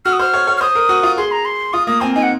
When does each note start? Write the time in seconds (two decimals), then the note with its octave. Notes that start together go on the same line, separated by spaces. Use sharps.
0.05 F#4 F6
0.13 D#6
0.19 C5 F6
0.34 C#5
0.47 C#5
0.57 F6
0.61 C5 D#6
0.75 A#4
0.89 F#4
1.03 F4
1.18 G#4 C6
1.32 A#5
1.45 C6
1.73 F4 D#6
1.87 A#3 D#6
2.01 C4 G#5
2.15 D#4 G#5
2.23 F#5